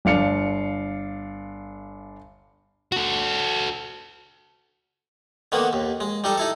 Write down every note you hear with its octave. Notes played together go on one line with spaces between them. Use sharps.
G1 D4 F5 C#7
F#4 A4
D3 D#3 A#3 B3
D#2
G#3
G3 D#4 A4
D#4 E4 A4